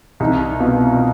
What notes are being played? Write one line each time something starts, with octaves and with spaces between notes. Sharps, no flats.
C2 D#4
B2 F4